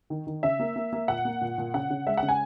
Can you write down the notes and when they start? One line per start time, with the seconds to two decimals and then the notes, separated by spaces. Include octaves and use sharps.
0.10 D#3
0.27 D#3
0.43 C#3 E5
0.60 A#3
0.76 A#3
0.93 A#3
1.08 A#2 F#5
1.25 A#3
1.41 A#2
1.58 A#2
1.74 C#3 F#5
1.90 C#3
2.07 G#3 E5
2.17 C#3 F#5
2.29 G#5